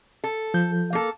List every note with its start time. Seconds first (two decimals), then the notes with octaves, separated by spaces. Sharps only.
0.24 A4
0.54 F3 G6
0.93 A#3 A4